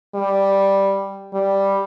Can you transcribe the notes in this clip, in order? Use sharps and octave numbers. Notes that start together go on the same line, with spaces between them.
G3
G3